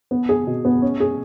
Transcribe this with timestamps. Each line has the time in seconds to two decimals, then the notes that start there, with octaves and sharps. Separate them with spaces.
0.11 B3
0.29 G#4
0.47 B2
0.65 B3
0.82 C#4
1.00 G#4